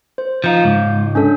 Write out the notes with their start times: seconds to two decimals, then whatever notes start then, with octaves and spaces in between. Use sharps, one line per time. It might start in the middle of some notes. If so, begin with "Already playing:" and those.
0.18 C5
0.44 F3 D#4 F5 G6
0.64 C#2 G#2
1.15 C#4 D4 A4